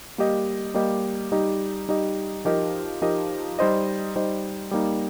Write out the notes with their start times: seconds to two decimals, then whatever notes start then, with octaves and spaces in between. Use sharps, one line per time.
0.18 G3 A#3 G4 D#5
0.74 G3 A#3 G4 D#5
1.32 G3 D#4 G4 D#5
1.88 G3 D#4 G4 D#5
2.45 F3 D#4 G4 A#4 D#5
3.02 F3 D#4 G4 A#4 D#5
3.59 G3 D#4 C5 D#5
4.16 G3 D#4 C5 D#5
4.71 G3 A#3 D#4